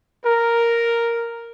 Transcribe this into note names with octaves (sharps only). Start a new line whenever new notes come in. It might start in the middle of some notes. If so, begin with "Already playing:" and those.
A#4